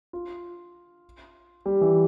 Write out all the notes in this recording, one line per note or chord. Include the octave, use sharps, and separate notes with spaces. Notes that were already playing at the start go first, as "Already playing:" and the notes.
F4
G3
E3